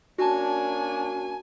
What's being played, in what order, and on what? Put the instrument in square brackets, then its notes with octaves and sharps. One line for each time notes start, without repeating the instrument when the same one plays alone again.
[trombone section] A#3 C#4 D4 [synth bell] F#4 A5 [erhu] G#5